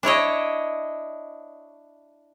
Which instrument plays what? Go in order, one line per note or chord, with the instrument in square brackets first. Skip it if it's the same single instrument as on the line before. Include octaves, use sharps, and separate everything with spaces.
[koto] D4 E4 C#5 D#5